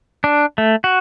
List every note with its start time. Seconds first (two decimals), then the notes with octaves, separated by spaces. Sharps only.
0.24 D4
0.58 A3
0.84 F#4